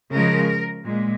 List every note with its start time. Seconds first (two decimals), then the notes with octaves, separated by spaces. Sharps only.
0.12 C#3 F3 G#3 A#4
0.84 A#2 G#3